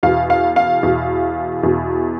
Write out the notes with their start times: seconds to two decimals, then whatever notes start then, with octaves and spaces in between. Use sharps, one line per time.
0.03 E2 B2 F5
0.30 F5
0.56 F5
0.83 E2 B2
1.63 E2 B2